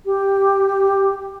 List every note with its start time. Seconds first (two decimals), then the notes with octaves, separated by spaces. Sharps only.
0.05 G4